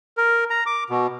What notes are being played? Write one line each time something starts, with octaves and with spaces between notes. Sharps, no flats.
A#4
A#5
D6
B2